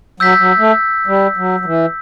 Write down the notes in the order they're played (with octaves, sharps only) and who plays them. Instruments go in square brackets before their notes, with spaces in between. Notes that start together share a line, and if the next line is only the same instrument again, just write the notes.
[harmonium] F#3 [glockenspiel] E6 G6 B6
[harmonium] F#3
A3
G3
F#3
F#3
E3